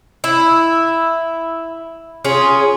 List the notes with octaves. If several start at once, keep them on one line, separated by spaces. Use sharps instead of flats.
E4
C#4 F4 G#4